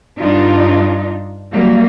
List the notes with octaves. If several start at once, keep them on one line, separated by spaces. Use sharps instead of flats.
G2 D4 D#4 F4
F#3 G3 A#3